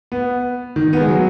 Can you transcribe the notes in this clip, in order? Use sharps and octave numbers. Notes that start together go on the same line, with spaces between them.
B3
D#3
B3
G#3
F#3